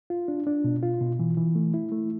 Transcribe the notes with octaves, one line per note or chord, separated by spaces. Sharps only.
F4
D4
D4
B2
F4
B2
E3
E3
A3
E4
A3